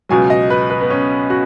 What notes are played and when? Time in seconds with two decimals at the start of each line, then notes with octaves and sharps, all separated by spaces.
0.09 C#2 B2 F#3 G#5
0.30 D#5
0.50 B4
0.70 B4
0.81 B3
0.90 C#4
1.30 F#4